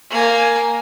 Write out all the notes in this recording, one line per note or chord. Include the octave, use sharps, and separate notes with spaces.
A#3 G#5